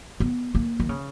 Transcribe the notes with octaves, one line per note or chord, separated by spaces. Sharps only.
B3
A#3
D#3
C#3